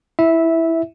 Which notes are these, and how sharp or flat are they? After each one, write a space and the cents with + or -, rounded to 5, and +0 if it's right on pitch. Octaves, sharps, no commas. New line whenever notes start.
E4 +0 E5 -10